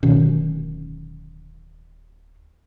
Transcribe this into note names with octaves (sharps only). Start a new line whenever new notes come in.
D1 B2 D#3 C#4